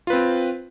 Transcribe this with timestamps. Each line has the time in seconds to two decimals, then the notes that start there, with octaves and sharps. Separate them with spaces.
0.07 F4
0.10 B4
0.13 C4